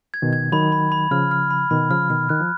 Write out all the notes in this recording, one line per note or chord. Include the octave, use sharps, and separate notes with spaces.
G#6
B2 D#3
G#6
D#3 F#3 B5
B5
B5
C#3 F3 F6
F6
B5
B2 D#3 B5
C#3 F3 F6
B2 D#3 F6
D#3 F#6
F3